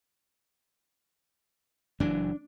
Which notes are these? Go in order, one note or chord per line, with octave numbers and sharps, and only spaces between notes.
F#1 E3 F#3 D4